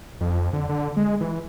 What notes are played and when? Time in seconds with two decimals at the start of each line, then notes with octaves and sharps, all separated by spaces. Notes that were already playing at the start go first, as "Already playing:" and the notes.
0.21 F2
0.53 D3
0.69 D3
0.97 G#3
1.21 E3